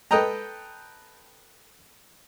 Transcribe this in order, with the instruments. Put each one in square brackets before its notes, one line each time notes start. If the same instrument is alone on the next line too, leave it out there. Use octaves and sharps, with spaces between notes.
[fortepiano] A4 B4 D#5 G5 A#5